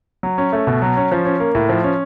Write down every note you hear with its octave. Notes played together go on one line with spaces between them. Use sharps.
F#3
C#4
A3
B2
F#3
C#4
F3
C#4
A#3
A2
F3
C#4